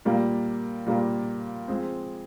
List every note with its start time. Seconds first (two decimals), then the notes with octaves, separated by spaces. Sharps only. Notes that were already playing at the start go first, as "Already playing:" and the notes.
0.05 A#2 G3 A#3
0.86 A#2 G3 A#3
1.68 F3 G#3 C4